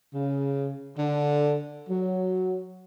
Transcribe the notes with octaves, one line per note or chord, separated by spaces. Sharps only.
C#3
D3
F#3